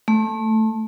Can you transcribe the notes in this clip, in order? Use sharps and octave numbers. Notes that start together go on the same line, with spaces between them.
A3